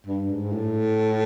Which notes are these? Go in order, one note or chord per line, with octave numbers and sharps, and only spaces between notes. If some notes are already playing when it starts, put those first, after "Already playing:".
G2
G#2
A2